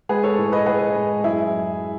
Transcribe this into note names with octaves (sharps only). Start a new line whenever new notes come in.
G#3 G#4 B4
A4 C#5
A2
B4 D#5
A2 G#4 B4
G#3
F#2 E4 G#4